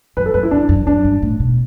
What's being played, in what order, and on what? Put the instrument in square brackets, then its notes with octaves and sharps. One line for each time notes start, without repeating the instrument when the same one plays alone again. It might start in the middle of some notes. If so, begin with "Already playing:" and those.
[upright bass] F#2 [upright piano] B4
[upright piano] A4
[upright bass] F#2 [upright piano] B4
[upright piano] E4
[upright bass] F#2 [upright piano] D4
[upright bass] F#2
[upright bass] F#2 [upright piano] D4
[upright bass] G2
A2
B2